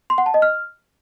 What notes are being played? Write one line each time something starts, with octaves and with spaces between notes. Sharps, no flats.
C6
F#5
A5
D#5
F6